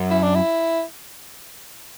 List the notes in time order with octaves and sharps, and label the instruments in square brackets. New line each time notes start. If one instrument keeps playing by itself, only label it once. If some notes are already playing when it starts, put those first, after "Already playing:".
Already playing: [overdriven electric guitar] F#2
[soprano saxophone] E4
D4
E4